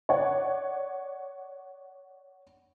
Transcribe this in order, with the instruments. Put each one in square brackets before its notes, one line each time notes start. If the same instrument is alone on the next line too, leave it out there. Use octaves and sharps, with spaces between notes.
[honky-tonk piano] C#5 D5 F#5